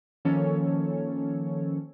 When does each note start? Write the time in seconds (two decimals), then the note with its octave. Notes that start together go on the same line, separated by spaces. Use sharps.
0.25 D#3 F3 A#3 C#4 A4 C#5